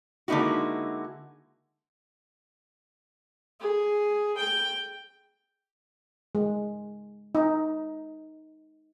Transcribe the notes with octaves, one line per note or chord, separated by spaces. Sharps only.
D3 G#3 A#3 D#4 E4 F#4
G#4
G5
G#3
D#4